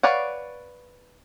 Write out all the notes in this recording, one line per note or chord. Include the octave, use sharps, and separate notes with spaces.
B4 C#5 D5 F5 F#5